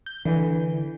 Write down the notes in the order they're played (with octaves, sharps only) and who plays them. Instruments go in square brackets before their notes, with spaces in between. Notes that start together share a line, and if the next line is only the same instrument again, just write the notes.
[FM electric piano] G6
[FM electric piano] D3 [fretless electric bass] E3